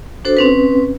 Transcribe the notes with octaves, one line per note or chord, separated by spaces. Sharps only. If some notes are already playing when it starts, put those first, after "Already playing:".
D4 F#4 A4 C5
C4 C#4 B4